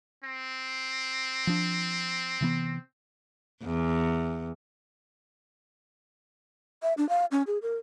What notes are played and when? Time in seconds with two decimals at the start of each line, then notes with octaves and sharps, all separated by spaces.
0.24 C4
1.47 F3 D4
2.41 C3 E3 B3
3.64 E2
6.83 E5
6.97 D4
7.09 F5
7.32 C#4
7.47 G#4
7.62 A#4